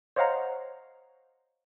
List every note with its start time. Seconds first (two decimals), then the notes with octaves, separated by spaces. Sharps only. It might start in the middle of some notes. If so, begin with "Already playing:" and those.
0.16 C5 C#5 D#5 F5 F#5 A#5